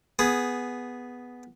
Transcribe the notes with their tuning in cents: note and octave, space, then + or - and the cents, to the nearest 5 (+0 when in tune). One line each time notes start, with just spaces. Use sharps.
B3 +0 G#4 +0